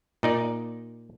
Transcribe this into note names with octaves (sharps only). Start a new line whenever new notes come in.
A#2 D#4 D5